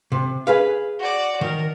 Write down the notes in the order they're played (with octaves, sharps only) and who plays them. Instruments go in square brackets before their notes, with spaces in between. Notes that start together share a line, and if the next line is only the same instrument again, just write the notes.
[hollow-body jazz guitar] C3
G#4 B4 F5
[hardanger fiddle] F#4 D5
[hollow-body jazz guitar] D#3 [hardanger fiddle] A#4